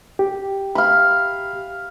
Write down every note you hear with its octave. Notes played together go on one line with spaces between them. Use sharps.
G4
F5 B5